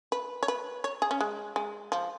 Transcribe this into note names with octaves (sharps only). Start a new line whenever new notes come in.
B4
C#5
B4
C#5
G#4
C#4
G#3
G#3
F3